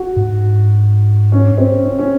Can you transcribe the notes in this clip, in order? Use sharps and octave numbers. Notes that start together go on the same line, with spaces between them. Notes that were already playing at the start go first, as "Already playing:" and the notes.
Already playing: F#4
G#2
C#4
C4
C#4
C#4